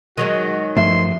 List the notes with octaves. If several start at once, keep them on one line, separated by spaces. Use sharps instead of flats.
D#3 F#3 G#3 F#4
G2 F3 A3 E5 C6